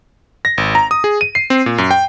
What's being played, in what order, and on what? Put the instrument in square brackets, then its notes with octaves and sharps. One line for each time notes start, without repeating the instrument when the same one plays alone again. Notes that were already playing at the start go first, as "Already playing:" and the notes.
[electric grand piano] A#6
G#1
A#5
D#6
G#4
D#7
C7
C4
A#2
F#2
G5